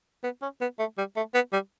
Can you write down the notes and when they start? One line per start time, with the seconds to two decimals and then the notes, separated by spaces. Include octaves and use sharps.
0.24 B3
0.42 C#4
0.61 B3
0.79 A3
0.98 G3
1.16 A3
1.35 B3
1.53 G3